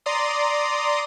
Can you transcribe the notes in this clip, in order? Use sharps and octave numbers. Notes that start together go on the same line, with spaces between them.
D5 A#5 C6 D#6